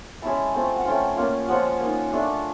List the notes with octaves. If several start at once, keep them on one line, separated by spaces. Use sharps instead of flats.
G#3 C#4 E4 A5
A3 C4 F4
F#5
A3 C#4 F4 G5
A#3 C#4 F4
F3 G#3 C#4 F4 F#5
A#3 D#4
A3 D4 F4